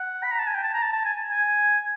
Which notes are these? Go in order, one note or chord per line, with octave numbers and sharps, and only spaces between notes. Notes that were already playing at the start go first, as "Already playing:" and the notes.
Already playing: F#5
B5
A#5
A5
G#5
G5
A5
A#5
A5
A5
G#5
G#5